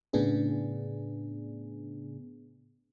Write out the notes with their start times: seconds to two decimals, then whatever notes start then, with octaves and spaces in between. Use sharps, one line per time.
0.13 A2 C#3 B3 D4 G#4